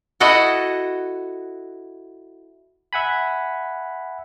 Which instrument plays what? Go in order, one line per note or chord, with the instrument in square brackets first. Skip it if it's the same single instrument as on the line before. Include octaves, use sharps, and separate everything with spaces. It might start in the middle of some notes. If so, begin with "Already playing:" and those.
[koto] E4 F#4 A4 D#5 F#5
[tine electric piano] E5 F#5 G#5 B5